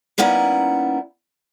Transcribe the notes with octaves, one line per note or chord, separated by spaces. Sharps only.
G3 A#3 B3 C#4 D#4 E4